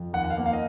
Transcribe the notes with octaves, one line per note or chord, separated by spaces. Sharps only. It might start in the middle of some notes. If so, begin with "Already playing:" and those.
Already playing: F2
D#2 F#5
F#5
F5
A#3
F5
D#5